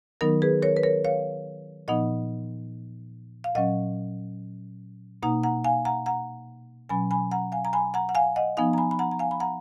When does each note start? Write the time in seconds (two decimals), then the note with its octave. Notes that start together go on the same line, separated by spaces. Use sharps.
0.21 D#3 F#3 B3 D#4 A#4
0.42 G#4 B4
0.62 A#4 C#5
0.76 B4
0.83 A#4 C#5
1.05 C#5 F5
1.88 A#2 F3 B3 D#4 D#5 F#5
3.44 F5
3.55 A#2 F#3 C#4 D#5 F#5
5.23 B2 A#3 D#4 F#5 A#5
5.43 F#5 A#5
5.64 F5 G#5
5.85 F#5 A#5
6.06 F#5 A#5
6.89 B2 F#3 C#4 G#5 B5
7.11 G#5 B5
7.31 F#5 A#5
7.52 F5 G#5
7.65 A#5
7.73 G#5 B5
7.94 F#5 A#5
8.09 F#5
8.15 F5 G#5
8.36 D#5 F#5
8.57 F3 B3 D#4 F5 G#5
8.73 A#5
8.78 G#5 B5
8.91 B5
8.99 F#5 A#5
9.11 A#5
9.19 F5 G#5
9.31 B5
9.40 F#5 A#5